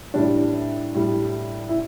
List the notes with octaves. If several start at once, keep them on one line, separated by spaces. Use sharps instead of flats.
A2 E3 G3 D4
A2 G3
E4